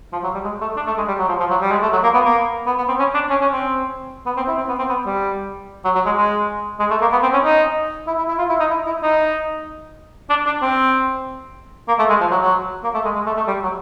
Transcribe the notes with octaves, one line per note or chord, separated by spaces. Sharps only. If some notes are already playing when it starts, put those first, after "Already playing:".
F3
F#3
G3
G#3
A3
D4
A3
G#3
G3
F#3
F3
F3
F#3
G3
G#3
A3
F#3
A#3
B3
A#3
B3
B3
C4
C#4
D4
C#4
C#4
C4
B3
C4
E4
C4
B3
C4
B3
G3
F#3
F#3
G#3
G#3
G#3
A3
A#3
B3
C4
C#4
D#4
E4
E4
E4
F4
E4
D#4
E4
E4
D#4
D4
D4
C4
A#3
A3
G#3
F3
F#3
F#3
A#3
A3
G#3
G#3
A3
A3
G3
F#3